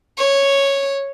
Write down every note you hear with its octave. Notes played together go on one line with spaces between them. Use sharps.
C#5